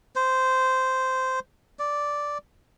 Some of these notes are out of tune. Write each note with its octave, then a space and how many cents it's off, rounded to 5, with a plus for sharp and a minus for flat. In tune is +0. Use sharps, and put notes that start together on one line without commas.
C5 -10
D5 -5